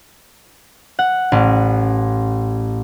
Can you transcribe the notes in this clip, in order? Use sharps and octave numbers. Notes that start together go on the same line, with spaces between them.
F#5
A1